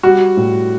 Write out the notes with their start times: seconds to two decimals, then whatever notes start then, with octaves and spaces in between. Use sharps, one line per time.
0.03 G3 F#4
0.37 A2